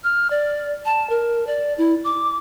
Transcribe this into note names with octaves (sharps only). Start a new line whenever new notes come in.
F6
D5
A5
A#4
D5
E4
D6